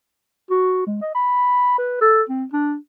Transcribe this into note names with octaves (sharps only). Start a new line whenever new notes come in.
F#4
G#3
D#5
B5
B4
A4
C4
D4